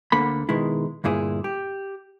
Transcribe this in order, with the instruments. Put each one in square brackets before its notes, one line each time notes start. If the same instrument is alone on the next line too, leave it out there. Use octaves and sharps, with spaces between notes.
[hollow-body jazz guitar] D2 D3 A#3 B5
B2 D#3 G#3 E4
D2 G2 A#2 E4 G#4
G4